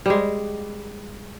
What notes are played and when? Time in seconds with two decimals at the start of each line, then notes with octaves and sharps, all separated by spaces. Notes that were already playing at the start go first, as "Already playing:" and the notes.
0.06 G3 G#3